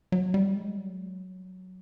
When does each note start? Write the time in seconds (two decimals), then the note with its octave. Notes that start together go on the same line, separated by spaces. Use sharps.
0.12 F#3
0.34 G3
0.55 G#3
0.77 F#3